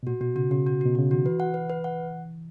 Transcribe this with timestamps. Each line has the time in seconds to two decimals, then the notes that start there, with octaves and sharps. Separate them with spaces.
0.03 B2
0.07 A#2 F#4
0.21 B2 F#4
0.36 C#3 F#4
0.51 C#3 F#4
0.67 F#4
0.81 B2 F#4
0.95 C#3 F#4
1.11 D#3 F#4
1.25 E3 B4
1.40 F#5
1.54 B4
1.70 B4
1.84 F#5